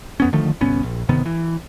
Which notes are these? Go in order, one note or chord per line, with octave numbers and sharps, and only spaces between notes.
F2 B3 C#4
D3 D#3 F3 A3
G1 C2 B3 C#4
A#1
G1 C3 D#3 B3
E3